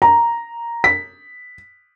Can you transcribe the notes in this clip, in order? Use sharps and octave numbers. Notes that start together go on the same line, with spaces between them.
A#5
B6